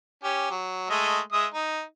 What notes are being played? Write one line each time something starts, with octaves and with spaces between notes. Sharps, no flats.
C#4 G4
F#3
G#3 A3 D#5
G#3 E5 D#6
D#4